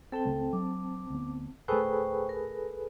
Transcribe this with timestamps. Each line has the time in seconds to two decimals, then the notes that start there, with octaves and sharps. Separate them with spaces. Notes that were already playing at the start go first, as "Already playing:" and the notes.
0.12 C4 A4 G5 A5
0.25 C#2 C#3 A3
0.53 F#3 D4 D6
1.10 D2 B3
1.68 D1 A3 G#4 A4 B4 C5 G5 C#6
2.29 A#4